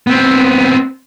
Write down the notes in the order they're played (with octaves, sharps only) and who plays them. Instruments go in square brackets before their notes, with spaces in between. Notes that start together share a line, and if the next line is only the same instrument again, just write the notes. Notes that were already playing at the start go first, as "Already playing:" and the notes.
[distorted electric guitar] B3 C4